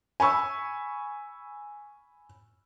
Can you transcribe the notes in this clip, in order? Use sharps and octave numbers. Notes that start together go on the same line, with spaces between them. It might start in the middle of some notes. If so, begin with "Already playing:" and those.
G#5 B5 C#6 E6